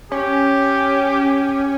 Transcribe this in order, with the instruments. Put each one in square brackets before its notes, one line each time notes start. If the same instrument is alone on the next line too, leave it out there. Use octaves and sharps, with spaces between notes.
[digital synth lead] C#4 [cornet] G4